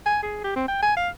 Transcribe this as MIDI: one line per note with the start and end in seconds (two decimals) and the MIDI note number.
0.06 0.20 80
0.23 0.44 68
0.44 0.55 67
0.56 0.65 60
0.68 0.81 79
0.82 0.95 80
0.96 1.09 77